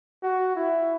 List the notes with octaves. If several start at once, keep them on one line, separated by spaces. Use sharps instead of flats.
F#4
E4